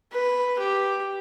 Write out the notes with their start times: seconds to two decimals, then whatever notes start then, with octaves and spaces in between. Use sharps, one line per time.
0.12 B4
0.59 G4